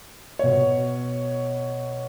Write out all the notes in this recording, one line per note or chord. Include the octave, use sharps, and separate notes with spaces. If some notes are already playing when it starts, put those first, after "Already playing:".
B2 C#5